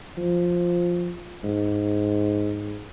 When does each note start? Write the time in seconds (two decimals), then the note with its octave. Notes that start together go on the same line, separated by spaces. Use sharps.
0.17 F3
1.44 G#2